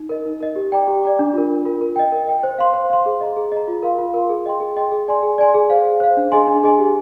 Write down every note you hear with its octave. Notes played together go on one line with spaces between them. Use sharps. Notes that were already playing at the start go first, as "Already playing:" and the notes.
Already playing: D#4
A#4 D#5
D#4
A#4 D#5
G4
D5 G5 A#5 D6
G4
D5 G5 A#5 D6
D4
F4 A#4
D4
F4 A#4
A#4
D#5 G5
A#4
D#5 G5
C5
F5 C6
C5
F5 C6
G#4
D#5 A#5
G#4
D#5 A#5
F4
A#4 F5 C6
F4
A#4 F5 C6
G#4
D#5 G5 C6
G#4
D#5 G5 C6
G#4
D5 G#5 C6
G#4
D5 G#5 C6
G#4
C5 F5
G#4
C5 F5
D4
G#4 D#5 G#5 C6
D4
G#4 D#5 G#5 C6
G4